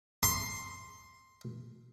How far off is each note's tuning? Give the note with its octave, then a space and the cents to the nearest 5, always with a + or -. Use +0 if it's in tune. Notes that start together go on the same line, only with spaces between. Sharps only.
C6 +5